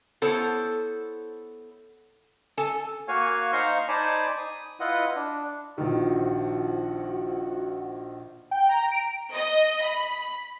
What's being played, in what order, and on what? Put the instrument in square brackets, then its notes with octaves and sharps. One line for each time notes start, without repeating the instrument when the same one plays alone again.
[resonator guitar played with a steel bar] B3 E4 A4 C5 C#5
A4 G#5 A5
[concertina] A#3 F#4 C#5 F5 G#5
D#4 C5 F5 A#5 C6 C#6
D#4 C5 D5 G#5 A5 B5
D#6
E4 F4 B4 D#5 F#5
D4
[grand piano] A#1 D#3 [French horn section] F3 F#4
[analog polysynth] G5
A#5
D7
[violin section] D#5
B5